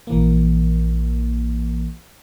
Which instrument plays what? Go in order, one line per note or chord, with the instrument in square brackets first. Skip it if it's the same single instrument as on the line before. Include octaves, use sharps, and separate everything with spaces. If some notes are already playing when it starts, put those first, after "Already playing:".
[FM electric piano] A#1 E3 A#3